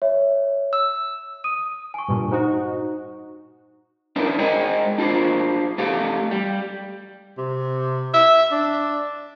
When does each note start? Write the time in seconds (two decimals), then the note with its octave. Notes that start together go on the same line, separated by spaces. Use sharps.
0.02 C#5 E5
0.73 E6
1.44 D#6 D#7
1.94 G#5 C#6
2.08 G2 A#2
2.31 D#4 F#4 C5
4.16 C#4 D4 E4 A#4 B4 D5
4.39 G#3 G#4 C5 D#5 G5 G#5
4.98 D4 F4 G#4 C5
5.78 A3 B3 G4 A4 F5
6.31 G3
7.38 C3
8.14 E5
8.52 D4